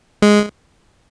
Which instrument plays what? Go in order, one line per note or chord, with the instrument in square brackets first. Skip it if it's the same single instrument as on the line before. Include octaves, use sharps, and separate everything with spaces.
[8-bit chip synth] G#3